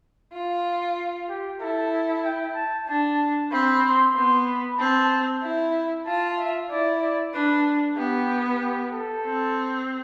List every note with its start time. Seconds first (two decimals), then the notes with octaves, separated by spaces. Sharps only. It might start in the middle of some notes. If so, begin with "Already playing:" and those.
0.33 F4
1.29 G4
1.61 E4 A4
2.25 G5
2.56 A5
2.87 D4 A5
3.52 C4 B5
3.84 C6
4.15 B3 C6
4.48 B5
4.79 C4 A5
5.42 E4
6.06 F4 A5
6.38 E5
6.70 E4 D5
7.02 D5
7.34 D4 B4
7.97 B3 G4
8.61 G4
8.93 A4
9.25 C4